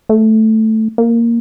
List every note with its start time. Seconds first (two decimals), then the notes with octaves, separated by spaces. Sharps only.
0.09 A3
0.98 A#3